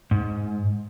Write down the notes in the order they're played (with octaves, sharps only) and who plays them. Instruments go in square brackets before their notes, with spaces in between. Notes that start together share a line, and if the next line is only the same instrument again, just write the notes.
[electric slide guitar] G#2